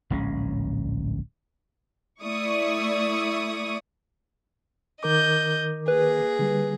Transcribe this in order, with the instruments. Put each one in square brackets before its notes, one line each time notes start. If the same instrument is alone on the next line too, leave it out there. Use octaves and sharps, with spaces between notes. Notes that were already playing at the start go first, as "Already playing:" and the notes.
[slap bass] D1 A#1 G#3 C#4
[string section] A3 E4 D5 C#6 D#6
[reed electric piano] D#3 A#4 D6 [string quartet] D#5 G6
[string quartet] A#3 G#4 [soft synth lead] B4
[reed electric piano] D3 G3